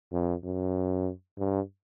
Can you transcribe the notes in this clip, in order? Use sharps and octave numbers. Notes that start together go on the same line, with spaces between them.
F2
F#2
G2